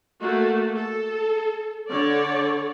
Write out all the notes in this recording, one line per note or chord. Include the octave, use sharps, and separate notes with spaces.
A3 A#3 F#4
A4
D3 C#5 D5